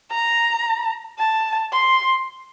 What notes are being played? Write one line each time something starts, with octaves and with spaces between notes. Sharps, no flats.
A#5
A5
C6